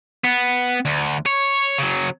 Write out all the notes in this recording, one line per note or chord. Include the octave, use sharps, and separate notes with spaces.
B3
D2
C#5
C#3 F#3